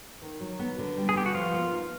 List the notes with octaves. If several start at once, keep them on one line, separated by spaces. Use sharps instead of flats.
D#3
F#3
B3
D3
G3
G#4
B3 G4
F#4
F3 F4
A#3
D#4